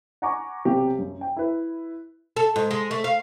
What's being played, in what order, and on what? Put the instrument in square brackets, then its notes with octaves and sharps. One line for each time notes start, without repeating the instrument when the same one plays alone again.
[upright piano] F#5 G#5 A#5 C#6 D6
B1 C3 G4
F#2
G5
E4 B4
[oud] A4
G#2
G#3
A3
F5